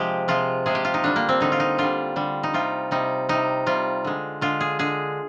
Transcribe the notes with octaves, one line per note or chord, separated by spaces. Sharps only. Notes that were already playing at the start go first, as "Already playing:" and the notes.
Already playing: C3 F3 G#3 G4
C3 F3 G#3 F4
C3 F3 G#3 G#4
G4
F4
D#4
D3 G3 D4
A#3
C4
D3 G3 D#4
F4
D#4
D3 G3 F4
D3 G3
D#4
C3 G3 F4
C3 G3 D#4
C3 G3 D#4
C3 G3 F4
D3 G#3
D3 G#3 F4
G#4
D3 G#3 G#4